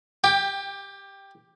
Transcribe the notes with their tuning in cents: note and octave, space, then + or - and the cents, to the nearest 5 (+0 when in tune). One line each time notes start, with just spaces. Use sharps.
G4 +5 G5 +25